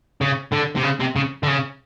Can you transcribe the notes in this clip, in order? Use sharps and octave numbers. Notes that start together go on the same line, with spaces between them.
C#3
D3
C3
C#3
C3
C#3
D3
C#3